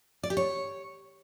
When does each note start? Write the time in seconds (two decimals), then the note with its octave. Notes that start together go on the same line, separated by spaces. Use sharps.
0.23 D5
0.30 G4
0.37 C#5